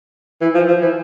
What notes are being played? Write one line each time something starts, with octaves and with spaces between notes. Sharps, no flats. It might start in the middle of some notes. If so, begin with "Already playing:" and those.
E3
F3
F3
E3